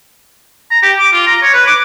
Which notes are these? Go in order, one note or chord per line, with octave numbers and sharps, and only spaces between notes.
A#5
G4
D6
F4
A#5
C#5
B4
D6